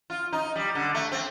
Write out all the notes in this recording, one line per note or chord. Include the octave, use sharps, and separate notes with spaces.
F4
D#4
G3
D3
A3
C4